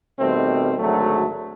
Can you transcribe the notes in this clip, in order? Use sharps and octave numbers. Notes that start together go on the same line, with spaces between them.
B2 D#3 G3 A3 C4
G#1 D2 F#3 A3